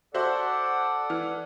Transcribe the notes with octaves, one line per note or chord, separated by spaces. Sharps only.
F#4 A4 C5 D5 E5 F#5
E3 F6